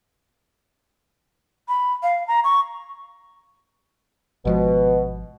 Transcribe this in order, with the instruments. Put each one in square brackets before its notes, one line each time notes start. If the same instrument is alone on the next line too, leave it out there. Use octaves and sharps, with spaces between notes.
[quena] B5
F5
A#5
C#6
[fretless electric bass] G#1 F3 G#3 [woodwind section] B2